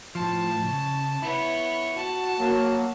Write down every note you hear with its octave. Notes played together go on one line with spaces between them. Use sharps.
A2 F3 A5
C#3
B3 E4 C#5
F#4 A5
F#3 A#3